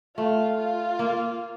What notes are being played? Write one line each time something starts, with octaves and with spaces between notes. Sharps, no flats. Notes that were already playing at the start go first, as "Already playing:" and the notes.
A3 F4
F4
A#3